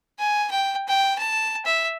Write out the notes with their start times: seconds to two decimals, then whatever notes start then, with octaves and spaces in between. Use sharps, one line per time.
0.19 G#5
0.51 G5
0.88 G5
1.19 A5
1.66 E5